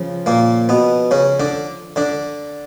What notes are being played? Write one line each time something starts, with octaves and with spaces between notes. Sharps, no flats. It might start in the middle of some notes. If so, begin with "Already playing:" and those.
Already playing: C#3 F3
A#2 A#3
B2 B3
C#3 C#4
D3 D4
D3 D4